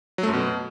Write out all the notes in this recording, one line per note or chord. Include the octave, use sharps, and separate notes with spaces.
F#3
A3
F#2
B2